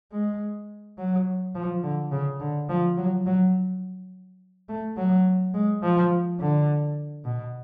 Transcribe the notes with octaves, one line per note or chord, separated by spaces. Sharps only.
G#3
F#3
F3
D3
C#3
D3
F3
F#3
F#3
A3
F#3
G#3
F3
D3
B2